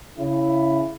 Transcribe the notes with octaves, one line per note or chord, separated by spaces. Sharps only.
C#3 E4